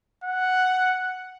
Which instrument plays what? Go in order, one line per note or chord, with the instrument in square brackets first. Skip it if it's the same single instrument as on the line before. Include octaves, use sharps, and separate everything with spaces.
[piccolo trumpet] F#5